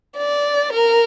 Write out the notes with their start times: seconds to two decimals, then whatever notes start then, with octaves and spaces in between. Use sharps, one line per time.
0.18 D5
0.72 A#4